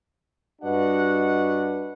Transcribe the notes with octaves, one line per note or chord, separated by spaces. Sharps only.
G2 D4 F#4 B4 D#5 F#5